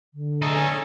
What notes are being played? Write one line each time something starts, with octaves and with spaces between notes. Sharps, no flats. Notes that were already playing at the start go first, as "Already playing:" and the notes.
D3
A3 D#4 G#4 A4
C#4 G#5